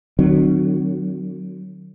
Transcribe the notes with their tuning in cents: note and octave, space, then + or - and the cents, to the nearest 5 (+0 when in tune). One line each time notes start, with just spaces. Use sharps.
D#3 -45 F#3 +0 C4 -15